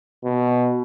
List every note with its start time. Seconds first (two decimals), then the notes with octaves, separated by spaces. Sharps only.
0.25 B2